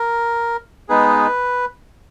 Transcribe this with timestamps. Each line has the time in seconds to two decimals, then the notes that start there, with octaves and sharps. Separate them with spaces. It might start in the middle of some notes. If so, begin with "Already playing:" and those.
Already playing: A#4
0.89 G#3 B3 D#4 G#4 B4